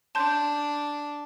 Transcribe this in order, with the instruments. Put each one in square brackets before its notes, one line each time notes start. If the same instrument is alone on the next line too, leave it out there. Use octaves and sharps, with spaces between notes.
[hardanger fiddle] D4 [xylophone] A5 C6 G6